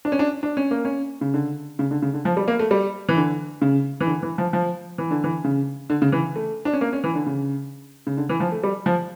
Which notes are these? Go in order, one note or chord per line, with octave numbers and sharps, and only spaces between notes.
D4
C#4
D4
D4
C#4
A#3
C#4
C#3
D3
C#3
D3
C#3
D3
F3
G3
A#3
A3
G3
E3
D3
C#3
E3
D3
E3
F3
F3
E3
D3
E3
C#3
D3
C#3
E3
A3
D4
C#4
A#3
C#4
E3
D3
C#3
C#3
D3
E3
F3
A3
G3
F3